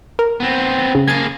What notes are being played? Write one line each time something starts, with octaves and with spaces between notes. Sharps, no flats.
A#4
B3 C4
C#3
A#3 G#4 G#6 A6